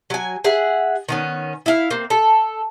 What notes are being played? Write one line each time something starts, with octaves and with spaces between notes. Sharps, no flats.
F#3 G#5
G#4 E5 F#5
D#3 B3 C#4
E4 F5
A#3 C4
A4